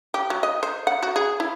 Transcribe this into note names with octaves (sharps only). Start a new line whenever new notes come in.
G4
F#3
D#5
C5
F#5
F#4
G#4
E4